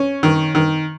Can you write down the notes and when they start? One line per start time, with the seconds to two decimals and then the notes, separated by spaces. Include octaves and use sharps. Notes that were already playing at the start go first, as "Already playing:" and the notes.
Already playing: C#4
0.23 D#3
0.55 D#3